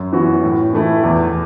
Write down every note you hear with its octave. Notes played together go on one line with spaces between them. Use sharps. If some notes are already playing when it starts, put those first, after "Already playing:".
Already playing: F#2
E3 B3 F#4
A2
E3 A3 E4
E2